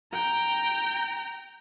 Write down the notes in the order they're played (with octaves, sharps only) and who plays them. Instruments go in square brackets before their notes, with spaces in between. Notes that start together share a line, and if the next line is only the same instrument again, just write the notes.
[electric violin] G5 A#5